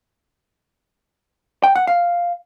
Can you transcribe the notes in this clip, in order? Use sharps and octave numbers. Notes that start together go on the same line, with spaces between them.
G5
F#5
F5